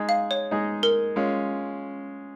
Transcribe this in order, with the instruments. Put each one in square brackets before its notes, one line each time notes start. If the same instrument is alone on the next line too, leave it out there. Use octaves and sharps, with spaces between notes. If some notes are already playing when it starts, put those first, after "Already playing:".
Already playing: [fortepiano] G#3 D#4 G#4
[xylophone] F5
C#5
[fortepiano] G#3 D#4 G#4
[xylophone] A#4
[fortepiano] G#3 C#4 F4